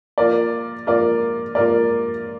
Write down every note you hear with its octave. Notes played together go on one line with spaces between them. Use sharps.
A#3 F4 A#4 D5
A#3 F4 A#4 D5
A#3 F4 A#4 D5